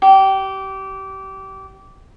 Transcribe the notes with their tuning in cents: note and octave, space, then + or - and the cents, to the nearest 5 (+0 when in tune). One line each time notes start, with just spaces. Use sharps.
G4 -25